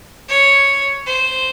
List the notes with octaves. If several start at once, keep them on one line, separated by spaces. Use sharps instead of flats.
C#5
C5